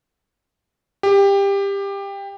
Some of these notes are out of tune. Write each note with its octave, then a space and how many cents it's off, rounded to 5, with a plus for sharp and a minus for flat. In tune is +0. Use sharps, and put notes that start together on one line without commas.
G4 +20